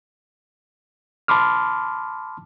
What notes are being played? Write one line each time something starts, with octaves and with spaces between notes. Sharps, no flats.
A5 B5 C6 D6 F6